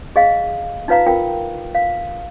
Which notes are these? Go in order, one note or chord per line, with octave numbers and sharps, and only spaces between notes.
G#4 D#5 F5
D#4 F4 B4 F5 A#5
F4 A#4 G5
F5